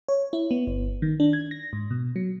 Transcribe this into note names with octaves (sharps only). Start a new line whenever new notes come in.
C#5
E4
B3
G1
D#3
D4
G#6
A#6
G#2
B2
F#3